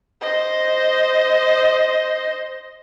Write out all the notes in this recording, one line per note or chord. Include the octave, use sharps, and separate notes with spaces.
C5 D#5